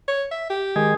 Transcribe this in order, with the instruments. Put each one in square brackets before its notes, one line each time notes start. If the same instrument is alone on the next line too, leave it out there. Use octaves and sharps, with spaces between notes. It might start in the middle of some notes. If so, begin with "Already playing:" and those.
[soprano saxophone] C#5
E5
G4
[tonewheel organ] D#3 G#3 G#4